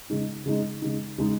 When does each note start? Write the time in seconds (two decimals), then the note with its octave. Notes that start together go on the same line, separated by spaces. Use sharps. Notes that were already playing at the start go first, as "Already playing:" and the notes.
0.10 C#3 G#3 D#4
0.46 C#3 G#3 D#4
0.82 C#3 G#3 D#4
1.18 C#3 G#3 D#4